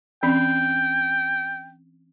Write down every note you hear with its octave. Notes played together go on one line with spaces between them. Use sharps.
E3 C4 C#4 G5